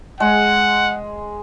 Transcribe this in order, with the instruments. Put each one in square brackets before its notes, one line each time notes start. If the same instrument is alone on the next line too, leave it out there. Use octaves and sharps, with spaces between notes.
[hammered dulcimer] G#3 [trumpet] F#5